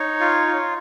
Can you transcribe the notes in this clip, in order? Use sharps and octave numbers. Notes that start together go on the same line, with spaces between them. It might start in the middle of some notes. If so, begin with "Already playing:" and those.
Already playing: D#4 C#5
F4
F4